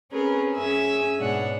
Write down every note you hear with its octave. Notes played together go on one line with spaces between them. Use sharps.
C4 C#4 G#4 A#4 B4
F#2 C#4 G#4 E5 G#5 E6
G#2 B2 G#3 D4 C#5 F#5